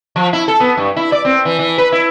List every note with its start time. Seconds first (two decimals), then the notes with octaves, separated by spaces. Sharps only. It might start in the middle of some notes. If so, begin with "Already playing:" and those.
0.16 F3
0.33 E4
0.48 A4
0.60 B3
0.77 G2
0.97 E4
1.12 D5
1.25 C4
1.45 E3
1.59 E3
1.78 B4
1.92 E4